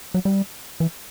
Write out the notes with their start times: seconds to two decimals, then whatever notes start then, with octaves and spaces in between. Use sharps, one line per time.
0.14 F#3
0.25 G3
0.80 E3